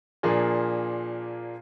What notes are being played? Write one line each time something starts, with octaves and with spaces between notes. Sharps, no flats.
A#2 F3 A#3 D4 G#4